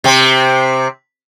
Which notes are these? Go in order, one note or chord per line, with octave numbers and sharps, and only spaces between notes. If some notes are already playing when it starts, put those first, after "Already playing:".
C3 C4